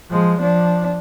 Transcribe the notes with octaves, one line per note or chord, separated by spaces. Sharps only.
F3 G#3
F3 D4